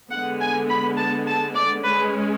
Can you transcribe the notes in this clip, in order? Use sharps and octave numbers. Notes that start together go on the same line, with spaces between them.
D3 G#3 B3 F#5
G#5
B5
A5
A5
D5
G#3 C#4 B4